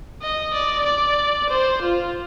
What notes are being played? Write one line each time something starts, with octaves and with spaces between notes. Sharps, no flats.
D#5
D5
D5
C5
F4